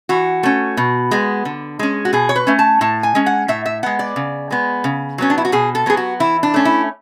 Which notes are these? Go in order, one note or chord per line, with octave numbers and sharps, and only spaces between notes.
E3 F#4
A3 C#4
B2
G#3 B3
D3
G#3 C#4
F#4
B2 G#4
C#5
B4
A3 C#4
A5
A2 A5
G#5
G#3 C#4
F#5
A2 E5
E5
G#3 B3 F#5
D5
C#3
G#3 B3
C#3
F#3 B3 C#4
D4
E4
F#4
B2 G#4
A4
F#3 B3 G#4
F#4
E3 E4
D4
A3 C#4
E4